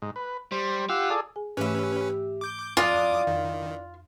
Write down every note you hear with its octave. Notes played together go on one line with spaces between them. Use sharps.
G#2
B4
G3 C5
F4 G4 F#5 E6
G#4 A4 D5
G#4 G#5
G#2 E3 A3 C#4 G4 B4 E5
D6 G6
F2 E3 D4 F4 D5 D6 D#6
F2 D#3